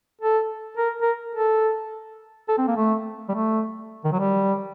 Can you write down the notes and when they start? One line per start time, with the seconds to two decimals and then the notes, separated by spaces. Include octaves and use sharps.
0.21 A4
0.77 A#4
1.02 A#4
1.35 A4
2.49 A4
2.58 C4
2.68 A#3
2.77 A3
3.29 G3
3.34 A3
4.05 D#3
4.12 F#3
4.19 G3